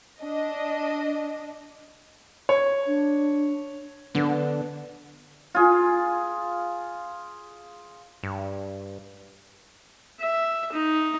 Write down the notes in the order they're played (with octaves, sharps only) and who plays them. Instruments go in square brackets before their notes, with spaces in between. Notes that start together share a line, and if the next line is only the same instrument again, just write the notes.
[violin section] D4 D#5
[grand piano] C#5
[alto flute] D4
[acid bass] D3 [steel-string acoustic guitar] B3 D4
[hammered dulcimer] F4 G#4
[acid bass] G2
[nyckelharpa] E5
D#4